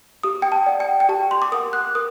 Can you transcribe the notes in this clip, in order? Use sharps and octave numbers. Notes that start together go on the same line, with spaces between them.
G4 D#6
G5
A5
D5 F#5
G5
G5
G4 A5
C6
D6
A#4 F#5 D#6
F#6
A#4 D#6